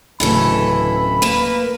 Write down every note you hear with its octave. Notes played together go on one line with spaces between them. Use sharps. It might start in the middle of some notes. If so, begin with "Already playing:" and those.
D1 C#3 E3 A4 B5
A#3 B4 E7